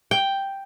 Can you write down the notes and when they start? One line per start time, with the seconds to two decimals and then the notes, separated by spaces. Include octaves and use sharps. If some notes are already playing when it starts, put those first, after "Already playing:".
0.11 G5